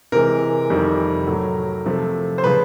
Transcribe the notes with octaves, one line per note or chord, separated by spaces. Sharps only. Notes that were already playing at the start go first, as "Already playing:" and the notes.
C3 E3 G#3 A#4
F2 C3 D#3 G3
A2 F#3 A3
C3 F3 A3
C5
C#3 F3 B4